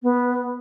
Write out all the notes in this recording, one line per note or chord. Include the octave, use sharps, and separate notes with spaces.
B3